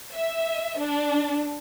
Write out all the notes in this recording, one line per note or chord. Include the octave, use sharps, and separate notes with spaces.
E5
D4